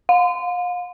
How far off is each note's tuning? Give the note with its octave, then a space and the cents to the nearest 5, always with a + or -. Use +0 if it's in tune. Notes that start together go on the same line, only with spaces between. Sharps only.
F5 +35